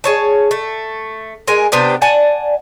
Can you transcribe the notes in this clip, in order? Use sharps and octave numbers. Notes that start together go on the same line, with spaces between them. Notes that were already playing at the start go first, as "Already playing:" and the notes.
G#4 C#5 A5
A3
G#3 A#4 G#5
C3 B3 D4 G4
D5 F#5 G#5 A5